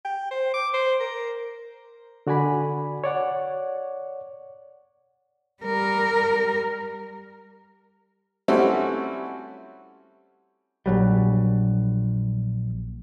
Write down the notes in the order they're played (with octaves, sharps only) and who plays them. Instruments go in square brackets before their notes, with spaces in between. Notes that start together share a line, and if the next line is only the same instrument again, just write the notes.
[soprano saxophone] G5
C5
D6
C5
A#4
[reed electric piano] D3 F#4 D5 G#5 B5
C#5 D5 F#5
[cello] G3 A#4
[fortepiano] G3 A3 C4 C#4 E4 F#4
[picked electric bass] A#1 F#3 G3